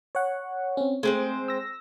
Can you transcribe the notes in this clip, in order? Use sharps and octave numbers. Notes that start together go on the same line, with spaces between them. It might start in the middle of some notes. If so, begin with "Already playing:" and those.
C#5 F#5
C4 C#4
G#3 A3 C4 C5
E6 A#6